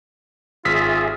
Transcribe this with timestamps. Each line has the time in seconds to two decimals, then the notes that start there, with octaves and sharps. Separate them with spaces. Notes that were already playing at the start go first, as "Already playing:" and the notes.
0.65 G#1 F4 G#4 E5 B6